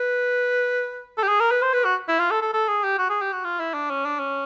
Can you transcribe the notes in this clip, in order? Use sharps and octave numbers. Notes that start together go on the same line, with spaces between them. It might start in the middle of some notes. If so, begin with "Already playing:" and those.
Already playing: B4
A4
G4
G#4
A#4
B4
C5
B4
F#4
E4
F4
A4
A4
A4
G#4
G4
F#4
G#4
G4
F#4
F4
E4
D4
C#4
D4
C#4